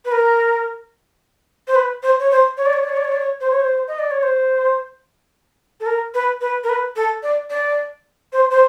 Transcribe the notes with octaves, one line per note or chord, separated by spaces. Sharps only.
B4
A#4
C5
B4
C5
C#5
C5
C#5
D5
C#5
D5
C#5
D5
C#5
D5
C#5
C5
C#5
C5
D#5
D5
C#5
C5
A4
A#4
B4
B4
A#4
B4
A4
D5
D5
C5
C5